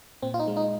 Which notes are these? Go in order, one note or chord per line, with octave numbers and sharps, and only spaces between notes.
A#2 C4
F4
D#4
G#3
D#4